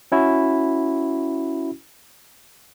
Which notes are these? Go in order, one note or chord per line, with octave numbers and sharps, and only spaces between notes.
C#4 E4 F#4